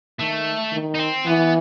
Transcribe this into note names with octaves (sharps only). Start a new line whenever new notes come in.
D#3 A3
D#3
D#4
C4
E3 B3